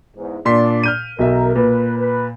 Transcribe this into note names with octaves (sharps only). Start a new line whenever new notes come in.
E2 G#2
A#2 D4 D5 C6 B6
F6 G6 D#7
B1 B2 A#4 E5
A#2 B4
B4